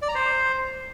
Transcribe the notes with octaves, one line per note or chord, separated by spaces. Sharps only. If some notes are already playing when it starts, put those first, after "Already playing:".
D5
A#5
C5